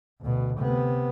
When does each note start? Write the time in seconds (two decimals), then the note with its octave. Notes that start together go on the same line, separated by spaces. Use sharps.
0.21 D2 B2
0.57 C3 B3